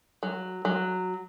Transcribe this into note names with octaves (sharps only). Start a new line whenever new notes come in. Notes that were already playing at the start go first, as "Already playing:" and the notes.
F#3
F#3